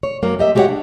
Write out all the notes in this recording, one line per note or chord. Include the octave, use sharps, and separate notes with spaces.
C#5
F#2 F#3 A#3
G4 D#5 E5
G#3 F#4 G4 A#4 C#5 F#5
D4